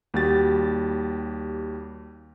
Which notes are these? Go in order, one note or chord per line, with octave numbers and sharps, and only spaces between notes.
D#2 G3 F#4 G4 A6